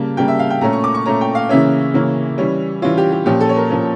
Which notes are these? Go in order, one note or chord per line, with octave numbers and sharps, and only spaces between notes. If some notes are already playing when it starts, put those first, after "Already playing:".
Already playing: C#3 G3 A#3 A5
C#3 G3 A#3 G5
E5
F5
G5
A#2 A3 C#4 A#5
C#6
D6
C#6
A#2 A3 C#4 A#5
G5
F5
C#3 E3 A#3 C#4 E5
C#3 E3 A#3 C#4
E3 G3 C#4
E3 G3 C#4 F4
G4
G4
A#2 F3 C#4 G4
A4
C#5
A#4
A#2 F3 C#4